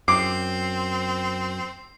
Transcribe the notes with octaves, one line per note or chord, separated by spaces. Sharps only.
F#2 C4 D6 C7